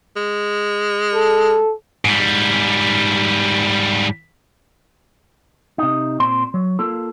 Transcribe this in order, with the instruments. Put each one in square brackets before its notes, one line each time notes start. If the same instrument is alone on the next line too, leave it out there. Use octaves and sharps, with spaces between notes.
[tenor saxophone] G#3
[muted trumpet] A4
[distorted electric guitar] G#2 G3
[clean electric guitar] C3 D#4
A#2 C4 C6
F#3
A#3 F4 A4